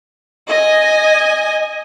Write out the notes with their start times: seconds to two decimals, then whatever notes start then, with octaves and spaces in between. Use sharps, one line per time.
0.48 D#5 G#5